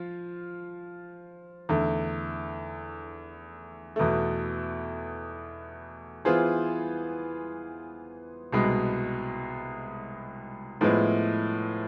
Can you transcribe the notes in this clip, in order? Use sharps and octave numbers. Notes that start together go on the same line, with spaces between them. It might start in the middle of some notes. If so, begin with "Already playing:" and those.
Already playing: F3 F4
E2 D3 A3
E2 B2 A3
E3 B3 F4 G#4 C5
C2 B2 G#3
A2 F3 G#3 B3 E4